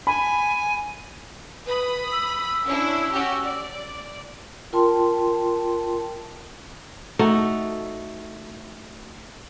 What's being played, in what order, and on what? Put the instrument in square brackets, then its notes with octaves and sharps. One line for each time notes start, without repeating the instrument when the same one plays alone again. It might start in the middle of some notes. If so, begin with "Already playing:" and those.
[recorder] G#5 [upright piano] B5
[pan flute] B4 [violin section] B5 D#6
[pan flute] E6
[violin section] C#4 D4 E4
C#4 F#4 G4
D5
[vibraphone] F4 A#4 G5 A5 C6
[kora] A3 D#4 F#4